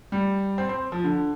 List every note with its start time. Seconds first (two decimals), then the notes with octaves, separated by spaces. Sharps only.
0.12 G3
0.58 C4
0.69 C4
0.92 F3
1.04 D3